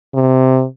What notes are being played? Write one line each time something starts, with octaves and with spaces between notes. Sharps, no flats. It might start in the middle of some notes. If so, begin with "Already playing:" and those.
C3